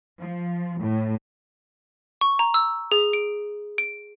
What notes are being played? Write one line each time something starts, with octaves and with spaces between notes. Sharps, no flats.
F3
A2
C#6
A#5
E6
G#4
D7
D7